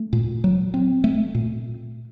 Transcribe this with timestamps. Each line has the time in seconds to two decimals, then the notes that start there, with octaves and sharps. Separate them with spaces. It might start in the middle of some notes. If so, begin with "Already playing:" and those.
Already playing: A3
0.13 A#2
0.44 F#3
0.74 C4
1.04 A3
1.35 A#2